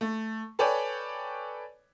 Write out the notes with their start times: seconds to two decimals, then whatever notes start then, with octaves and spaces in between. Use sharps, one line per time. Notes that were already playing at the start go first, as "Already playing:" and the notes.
0.01 A3
0.59 A4 B4 C#5 D5 G5 G#5